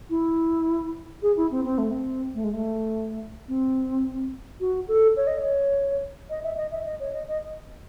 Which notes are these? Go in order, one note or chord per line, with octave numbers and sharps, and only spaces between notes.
E4
G#4
E4
C4
C4
A3
C4
A3
G#3
A3
C4
F#4
A4
C#5
D#5
C#5
D#5
E5
D#5
E5
D#5
C#5
D#5
D#5